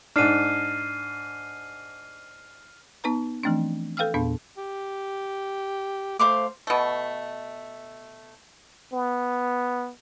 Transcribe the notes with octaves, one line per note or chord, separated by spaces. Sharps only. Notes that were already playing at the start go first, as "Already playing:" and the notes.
G#2 D4 F6 C7 D#7
B3 D#4 B4 A#5
E3 F3 A3 C4 D4
A4 B4 F5 G5 E6 F6
E2 A#2 B3 D4
G4
A3 C5 F5 D6
B2 A3
B3